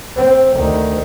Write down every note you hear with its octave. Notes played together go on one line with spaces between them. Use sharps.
C4
D2 D#3